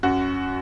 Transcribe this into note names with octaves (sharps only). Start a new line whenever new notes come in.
F#2 F#4